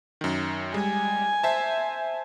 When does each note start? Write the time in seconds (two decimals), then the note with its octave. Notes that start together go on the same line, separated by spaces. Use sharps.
0.21 F#2 D#3
0.74 G3 G#3 G#5
1.43 C5 E5 A5